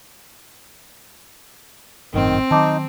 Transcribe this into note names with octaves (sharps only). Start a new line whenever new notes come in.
G#1 F#2 A2 D#3 C4
D#3 F#3 D#4 A5 D6